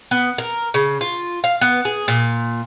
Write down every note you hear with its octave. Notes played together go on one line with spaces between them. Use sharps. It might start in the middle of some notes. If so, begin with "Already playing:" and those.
B3
A#4
C#3
F4
F5
B3
G#4
A#2